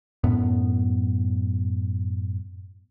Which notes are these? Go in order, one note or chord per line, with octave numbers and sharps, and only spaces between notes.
F#2 A2 B3